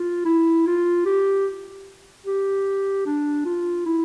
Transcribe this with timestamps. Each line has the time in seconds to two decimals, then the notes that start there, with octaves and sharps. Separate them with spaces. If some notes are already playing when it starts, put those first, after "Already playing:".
Already playing: F4
0.25 E4
0.67 F4
1.06 G4
2.26 G4
3.06 D4
3.45 F4
3.86 E4